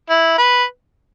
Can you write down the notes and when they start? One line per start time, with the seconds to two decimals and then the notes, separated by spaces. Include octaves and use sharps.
0.10 E4
0.38 B4